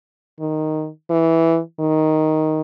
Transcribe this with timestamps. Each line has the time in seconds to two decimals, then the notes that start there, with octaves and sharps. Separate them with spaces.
0.40 D#3
1.10 E3
1.80 D#3